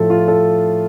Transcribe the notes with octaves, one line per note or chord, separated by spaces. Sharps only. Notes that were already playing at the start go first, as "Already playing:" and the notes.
Already playing: A2 F3 A3 A4 C5
F4
A4